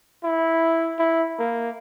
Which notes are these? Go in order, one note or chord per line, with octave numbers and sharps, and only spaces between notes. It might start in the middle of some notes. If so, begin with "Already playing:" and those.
E4
E4
A#3